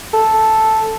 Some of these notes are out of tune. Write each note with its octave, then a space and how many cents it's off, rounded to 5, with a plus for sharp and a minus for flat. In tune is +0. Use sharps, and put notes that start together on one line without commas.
A4 +0